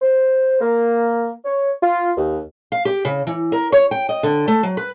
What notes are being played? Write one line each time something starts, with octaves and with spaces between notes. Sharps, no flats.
C5
A#3
C#5
F4
D#2
F5
G4
C#3
E3
A#4
C#5
G5
D#5
D3
A3
F#3
B4